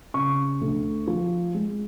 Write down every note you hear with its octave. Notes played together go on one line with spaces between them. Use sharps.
C#3 C#6
D2
F3
G#3